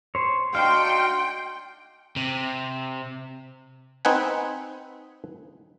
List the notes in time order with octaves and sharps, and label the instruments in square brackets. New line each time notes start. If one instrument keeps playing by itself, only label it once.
[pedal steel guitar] C5 C#5
[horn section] D4 D#4 C6 [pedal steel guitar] F#4 F5 [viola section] G5
[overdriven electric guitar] C3
[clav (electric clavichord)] C4 D#4 B4 F#5 G#5